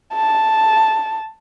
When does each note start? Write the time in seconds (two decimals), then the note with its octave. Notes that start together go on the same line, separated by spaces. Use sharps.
0.14 A5